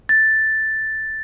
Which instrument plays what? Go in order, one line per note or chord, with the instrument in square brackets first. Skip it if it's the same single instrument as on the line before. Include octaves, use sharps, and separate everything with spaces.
[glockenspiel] A6